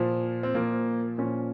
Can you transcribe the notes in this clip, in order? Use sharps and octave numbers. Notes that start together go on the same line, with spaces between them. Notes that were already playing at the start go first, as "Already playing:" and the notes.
Already playing: A#2 F3
C4
A#2 F3 A#3
A#2 F3 C#4